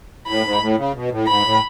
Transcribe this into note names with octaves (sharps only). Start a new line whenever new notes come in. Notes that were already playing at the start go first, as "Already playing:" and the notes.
A2 B5
G#2
A2
C#3
B2
A2
G#2 B5
A2